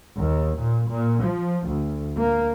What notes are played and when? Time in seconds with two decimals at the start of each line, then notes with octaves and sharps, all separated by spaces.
0.18 D#2
0.58 A#2
0.88 A#2
1.22 F3
1.66 D2
2.19 A#3